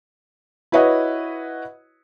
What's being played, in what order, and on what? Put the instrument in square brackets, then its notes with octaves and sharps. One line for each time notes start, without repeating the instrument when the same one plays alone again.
[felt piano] E4 F#4 B4 C#5 D#5 F#5